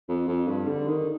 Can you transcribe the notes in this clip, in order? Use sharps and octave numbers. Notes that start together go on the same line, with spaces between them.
F2
F2
G2
D3
D#3